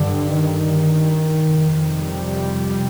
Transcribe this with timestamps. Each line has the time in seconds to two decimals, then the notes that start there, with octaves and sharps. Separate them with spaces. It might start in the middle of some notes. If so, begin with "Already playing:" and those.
Already playing: G2 D3
0.34 D#3
1.45 F2 C3
2.01 G3